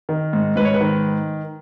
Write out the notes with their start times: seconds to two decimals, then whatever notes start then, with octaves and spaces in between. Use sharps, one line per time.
0.09 D#3
0.33 G#2
0.56 G#2 B4
0.65 C#5
0.74 B4
0.81 D#3